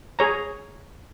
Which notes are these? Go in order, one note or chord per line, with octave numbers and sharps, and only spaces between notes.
G#4 C#5 A#5